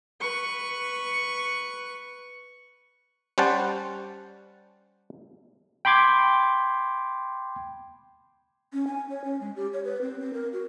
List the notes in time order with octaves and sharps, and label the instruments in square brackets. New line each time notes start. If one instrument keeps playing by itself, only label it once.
[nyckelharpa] B4 C#6
[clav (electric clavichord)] G3 C#4 C5 F#5 A5
[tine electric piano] G5 B5 C6 D6 G#6
[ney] C#4
G#5
C#5
C#4
G#3
G4
C#5
B4
C4
C4
A#4
F#4